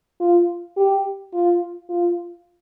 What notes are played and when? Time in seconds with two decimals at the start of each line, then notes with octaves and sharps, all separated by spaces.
0.20 F4
0.76 G4
1.33 F4
1.89 F4